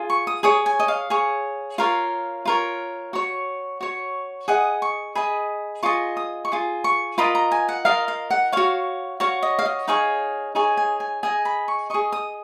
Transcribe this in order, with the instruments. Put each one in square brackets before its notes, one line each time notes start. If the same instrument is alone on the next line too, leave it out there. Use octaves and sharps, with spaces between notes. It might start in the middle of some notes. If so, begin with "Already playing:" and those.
Already playing: [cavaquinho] F4 G#4
C#6
D#6
G#4 C#5 D#6
G#5
D#5
F5
G#4 C#5
F4 A#4 C#5 F5
F4 A#4 C#5
F#4 C#5
F#4 C#5
G#4 D#5 F#5
C#6
G#4 D#5 B5
F4 G#4 D#5 C#6
D#6
C#6
F4 G#4
C#6
F4 A#4 D#5 B5
A#5
G#5
F#5
F4 A#4 D#5 F5
F5
F#5
F#4 C#5 F5
F#4 C#5 F5
D#5
F5
D#5
D#4 G#4 C#5 F5
D#4 G#4 C#5 G#5
G#5
G#5
G#4 D#5 G#5
B5
C#6
G#4 D#5 C#6
D#6